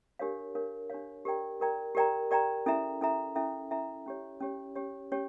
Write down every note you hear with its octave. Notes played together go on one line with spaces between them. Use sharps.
D4 G4 A#4 C#5 F5
D4 G4 A#4 C#5 F5
D4 G4 A#4 C#5 F5
G4 A#4 D5 G5 A#5
G4 A#4 D5 G5 A#5
G4 A#4 D5 G5 A#5
G4 A#4 D5 G5 A#5
C#4 E4 A4 E5 A#5
C#4 E4 A4 E5 A#5
C#4 E4 A4 E5 A#5
C#4 E4 A4 E5 A#5
C#4 G4 C#5
C#4 G4 C#5
C#4 G4 C#5
C#4 G4 C#5